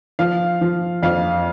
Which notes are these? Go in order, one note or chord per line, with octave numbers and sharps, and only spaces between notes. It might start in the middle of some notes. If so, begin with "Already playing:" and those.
F3 F5
F3
F2 F5